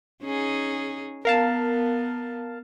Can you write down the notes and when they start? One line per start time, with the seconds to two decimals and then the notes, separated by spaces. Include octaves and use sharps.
0.22 C#4 D#4 G#4
1.25 B3 A#4 F5 A5